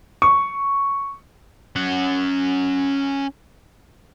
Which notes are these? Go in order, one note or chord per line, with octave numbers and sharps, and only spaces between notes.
C#6
C#4 F#5